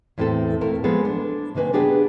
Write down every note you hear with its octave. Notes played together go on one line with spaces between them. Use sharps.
E2 A2 C4 E4 A4
A#2 A3 A4 A#4
F3 G#3 B3 G#4 A4
D4
C3 D#3 A#3 B4 G#5
B3 D4 G4 G#4 B4